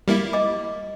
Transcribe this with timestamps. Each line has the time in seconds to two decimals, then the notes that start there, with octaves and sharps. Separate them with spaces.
0.08 G3 A#3 E4
0.33 D#5 D6